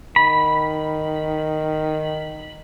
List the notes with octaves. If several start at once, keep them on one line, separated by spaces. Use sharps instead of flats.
D#3 B5